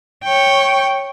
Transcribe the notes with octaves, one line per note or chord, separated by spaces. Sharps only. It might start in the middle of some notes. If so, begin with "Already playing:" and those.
C#5 G5